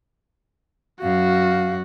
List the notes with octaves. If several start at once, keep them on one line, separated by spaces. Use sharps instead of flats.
F#2 F#4 F5